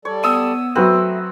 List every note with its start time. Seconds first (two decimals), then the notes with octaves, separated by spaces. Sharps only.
0.05 G3 A4 C#5 D5
0.24 B3 D#6 E6
0.76 F#3 A3 C4 F#4 B4